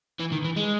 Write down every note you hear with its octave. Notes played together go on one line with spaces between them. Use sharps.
E3
D#3
E3
G#3